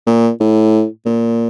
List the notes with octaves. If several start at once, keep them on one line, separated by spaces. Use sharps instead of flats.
A#2
A2
A#2